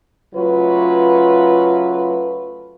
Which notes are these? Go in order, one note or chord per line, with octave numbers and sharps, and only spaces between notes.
C#3 F#3 A3 F4 B4